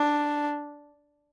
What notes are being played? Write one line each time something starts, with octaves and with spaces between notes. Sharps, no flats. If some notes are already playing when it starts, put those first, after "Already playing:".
Already playing: D4